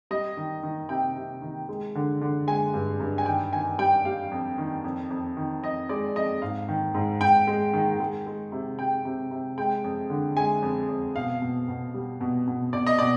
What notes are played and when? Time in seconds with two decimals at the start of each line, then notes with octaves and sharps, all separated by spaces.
0.11 G3 D#5
0.37 D#3
0.63 D#3
0.89 C3 G5
1.16 C3
1.42 D#3
1.69 G#3
1.95 D3
2.21 D3
2.47 G#3 G#5
2.74 G2
3.00 G2
3.18 G#5
3.26 D#3 G5
3.53 D#3 G#5
3.79 G3 G5
4.05 G3 F5
4.31 F2
4.58 D#3
4.84 F2
5.10 F2
5.37 D#3
5.63 F2 D#5
5.89 G#3 D5
6.16 F2 D#5
6.42 G#2 F5
6.68 D#3
6.94 G#2
7.21 G#2 G5
7.47 G#3
7.73 D#3
8.00 G#3
8.27 G#3
8.52 C3
8.79 C3 G5
9.05 C3
9.31 C3
9.58 G#3 G5
9.84 F2
10.10 D3
10.37 G#3 G#5
10.62 F2
10.89 F2
11.16 B2 F5
11.42 B2
11.68 B2
11.94 G3
12.21 B2
12.47 B2
12.73 B2 D5
12.86 D#5
12.98 B2 D5